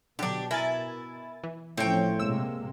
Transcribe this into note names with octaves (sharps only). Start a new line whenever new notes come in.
B2 D3 F#3 D4 G4
E4 A#4 G#5 A6
E3
A2 F3 C4 C#4 C#5 G5
C3 G#3 A#3 E6